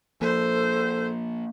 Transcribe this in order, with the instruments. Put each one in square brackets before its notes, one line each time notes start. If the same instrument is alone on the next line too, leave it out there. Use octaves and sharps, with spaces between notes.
[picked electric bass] F3 A#3 [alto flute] A4 [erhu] C5